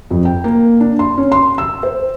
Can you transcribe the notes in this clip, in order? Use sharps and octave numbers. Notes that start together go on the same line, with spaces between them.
F2
G5
A#3
D4
C6
C#4
C6
E6
C5